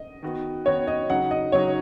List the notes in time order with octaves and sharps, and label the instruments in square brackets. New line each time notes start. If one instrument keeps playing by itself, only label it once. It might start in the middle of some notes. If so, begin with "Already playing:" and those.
Already playing: [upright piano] D#5
[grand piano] D#3 B3 F#4
[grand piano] D#3 B3 F#4 [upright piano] C#5
[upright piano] D#5
[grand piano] C#3 F#3 D#4 [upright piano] F#5
[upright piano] D#5
[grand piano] C#3 F#3 D#4 [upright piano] C#5